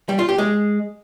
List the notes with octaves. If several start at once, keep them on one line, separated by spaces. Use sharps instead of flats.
G3
F4
G4
G#3